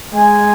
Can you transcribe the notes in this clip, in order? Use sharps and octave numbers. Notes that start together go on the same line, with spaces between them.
G#3 G#5